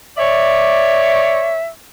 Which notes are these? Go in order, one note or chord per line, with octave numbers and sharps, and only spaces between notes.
C#5 D5 E5